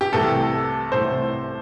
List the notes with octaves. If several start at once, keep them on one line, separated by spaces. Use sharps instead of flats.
G4
C2 C3 E3 A3 A4
C2 C3 E3 A3 C5